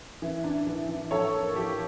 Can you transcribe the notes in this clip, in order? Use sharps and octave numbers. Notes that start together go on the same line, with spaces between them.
E3
D4
E3
E3
F3 A4 C#5
A#3
F3 G4